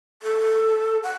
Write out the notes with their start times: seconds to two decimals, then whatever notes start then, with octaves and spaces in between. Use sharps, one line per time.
0.22 A4
1.03 F#5